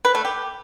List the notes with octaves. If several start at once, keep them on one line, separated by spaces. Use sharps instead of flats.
B4
A3
G4